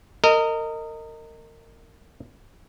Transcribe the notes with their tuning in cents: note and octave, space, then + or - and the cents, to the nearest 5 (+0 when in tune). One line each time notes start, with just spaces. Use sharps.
A#4 -30 D#5 +0